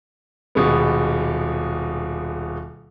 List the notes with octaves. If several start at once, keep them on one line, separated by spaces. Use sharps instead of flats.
D#1 B2 G#3 B3